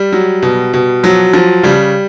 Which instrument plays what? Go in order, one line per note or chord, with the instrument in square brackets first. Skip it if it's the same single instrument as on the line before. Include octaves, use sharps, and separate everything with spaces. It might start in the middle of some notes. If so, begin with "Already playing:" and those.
Already playing: [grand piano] G3
F#3
B2
B2
F3 F#3
F3
C#3 G3